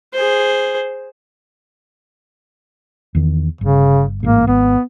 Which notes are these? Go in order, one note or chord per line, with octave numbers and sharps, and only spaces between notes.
G#4 C5
E2 D#3
G1 C#3
A1 G#2 A#3
G#1 B3